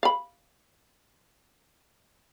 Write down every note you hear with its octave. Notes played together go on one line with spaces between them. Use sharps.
F5 B5